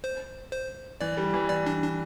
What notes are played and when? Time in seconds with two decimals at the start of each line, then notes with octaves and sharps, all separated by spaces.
0.04 C5
0.52 C5
1.01 E3 D5
1.17 G3
1.34 E3
1.49 E3 D5
1.66 D4
1.82 D4